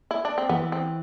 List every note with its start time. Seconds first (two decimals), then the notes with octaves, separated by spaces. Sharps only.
0.11 E4
0.25 D4
0.38 C4
0.49 E3 B3
0.72 C4